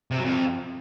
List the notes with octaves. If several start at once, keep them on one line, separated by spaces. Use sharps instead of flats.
C3
F#3
F2